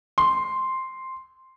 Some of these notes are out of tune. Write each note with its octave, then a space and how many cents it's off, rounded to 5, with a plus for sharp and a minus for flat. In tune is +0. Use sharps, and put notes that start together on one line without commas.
C6 +0